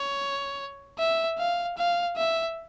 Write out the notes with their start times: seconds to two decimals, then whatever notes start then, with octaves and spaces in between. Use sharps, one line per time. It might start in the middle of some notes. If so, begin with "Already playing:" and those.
Already playing: C#5
0.99 E5
1.39 F5
1.77 F5
2.17 E5